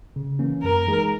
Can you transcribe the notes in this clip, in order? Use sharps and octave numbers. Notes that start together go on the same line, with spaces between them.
C#3
E3 A#3 C#4
F#2 A#4
E3 G#3 D#4 G#4